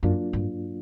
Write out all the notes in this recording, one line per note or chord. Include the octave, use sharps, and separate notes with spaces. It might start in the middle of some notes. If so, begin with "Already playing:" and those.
F#2 F#3 A#3 D4 F4
G2